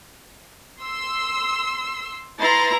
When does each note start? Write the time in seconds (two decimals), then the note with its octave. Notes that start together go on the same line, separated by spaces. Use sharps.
0.82 C6 E6
2.39 E4 B4 A#5 C6 A6